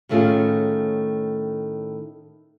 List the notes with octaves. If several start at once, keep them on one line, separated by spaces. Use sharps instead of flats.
A2 D#3 A3 C#4 F4 G#4